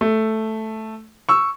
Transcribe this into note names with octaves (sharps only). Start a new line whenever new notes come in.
A3
C#6 E6